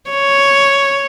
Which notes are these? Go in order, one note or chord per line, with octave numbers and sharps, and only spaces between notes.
C#5